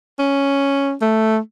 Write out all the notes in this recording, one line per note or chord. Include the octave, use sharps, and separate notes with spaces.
C#4
A3